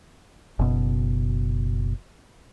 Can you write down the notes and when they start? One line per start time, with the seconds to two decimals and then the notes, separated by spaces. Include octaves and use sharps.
0.59 F#1 B2